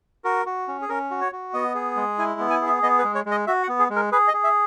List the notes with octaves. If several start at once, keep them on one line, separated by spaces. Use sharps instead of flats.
F#4 A#4
F#4
C#4
G#4
C#4 A#4
F#4
C#5
F#4
B3 D#5
G#4
G#3
E4 G#5
B3
G#5
G#4
E5
B3 D#5
B4
G#3
C#5
G#3
D#5
F#4 E5
F#5
B3
G#4
G#3
A#4
G#4 B4
D#5
G#4
E5